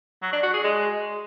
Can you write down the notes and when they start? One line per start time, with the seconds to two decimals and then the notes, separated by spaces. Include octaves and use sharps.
0.22 F#3
0.33 D4
0.43 F#4
0.54 G#4
0.64 G#3